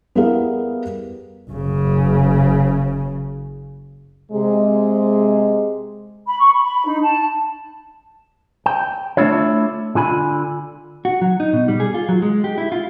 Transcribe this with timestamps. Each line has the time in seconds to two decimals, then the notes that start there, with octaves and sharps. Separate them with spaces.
0.15 G3 B3 E4 G#4 A#4 F5
1.51 F#1 C#3
4.32 C3 G#3
6.27 B5
6.39 C#6
6.52 B5
6.64 B5
6.86 D#4
7.03 A5
8.66 G5
9.17 A3 C#4 D4 E4 F4 C#5
9.95 D3 F4 G#5 B5
11.05 F#4
11.21 F#3
11.40 D#4
11.53 B2
11.68 G3
11.80 G#4
11.94 F4
12.09 F#3
12.22 G#3
12.44 G4
12.58 E4
12.72 F4